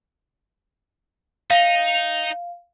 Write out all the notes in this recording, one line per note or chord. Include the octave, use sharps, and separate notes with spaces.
D#4 F5